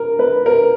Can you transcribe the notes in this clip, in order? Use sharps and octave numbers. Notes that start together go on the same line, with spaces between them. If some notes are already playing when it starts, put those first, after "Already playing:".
Already playing: A#4
B4
A#4